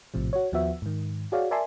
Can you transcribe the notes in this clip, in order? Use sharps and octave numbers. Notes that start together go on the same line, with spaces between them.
A#1 A2 C3 F3
F#4 C#5
D#2 F3 B3 F#4 E5
G#2 D#3
F#4 G#4 C#5 D5 F5
A#4 D5 E5 G#5 A5 C6